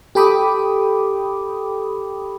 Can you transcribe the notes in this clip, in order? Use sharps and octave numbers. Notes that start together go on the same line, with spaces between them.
G4 A4 G5 B5 D6 D#6